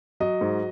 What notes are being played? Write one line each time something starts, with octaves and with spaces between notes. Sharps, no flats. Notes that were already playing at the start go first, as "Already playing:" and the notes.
F#3 D#5
G#2